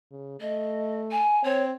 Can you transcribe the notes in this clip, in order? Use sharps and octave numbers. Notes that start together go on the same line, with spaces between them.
C#3
A3 D#5
G#5
C4 C#5